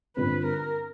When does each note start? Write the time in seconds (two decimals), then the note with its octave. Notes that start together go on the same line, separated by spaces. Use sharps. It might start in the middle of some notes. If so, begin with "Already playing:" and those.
0.16 G2 D3 G3 C4 F4 B4
0.46 A#4